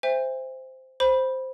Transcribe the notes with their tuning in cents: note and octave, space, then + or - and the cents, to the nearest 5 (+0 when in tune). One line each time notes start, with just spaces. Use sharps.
C5 -5 E5 +0 G#5 -45
C5 +0 B5 -10